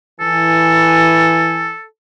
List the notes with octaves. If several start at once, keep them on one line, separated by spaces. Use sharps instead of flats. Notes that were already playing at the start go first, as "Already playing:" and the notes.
E3 A4 G#5